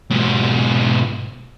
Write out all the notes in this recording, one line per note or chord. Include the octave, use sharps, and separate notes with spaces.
G#2 B2